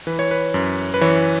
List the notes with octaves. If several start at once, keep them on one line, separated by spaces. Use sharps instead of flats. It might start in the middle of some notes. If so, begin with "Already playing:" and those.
E3 B4
C#5
B4
F#2
B4
E3 C#5